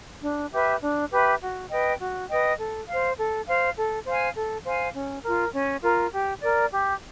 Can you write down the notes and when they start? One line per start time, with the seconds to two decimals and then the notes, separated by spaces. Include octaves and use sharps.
0.22 D4
0.51 G4 B4 E5
0.81 D4
1.11 G4 B4 E5
1.40 F#4
1.69 B4 D#5 G5
1.99 F#4
2.28 B4 D#5 G5
2.58 A4
2.88 C5 F5
3.17 A4
3.46 C5 F5
3.76 A4
4.06 C5 F5 G#5
4.35 A4
4.64 C5 F5 G#5
4.94 C#4
5.23 F4 A#4
5.53 C#4
5.82 F4 A#4
6.12 G4
6.41 A#4 D5
6.71 G4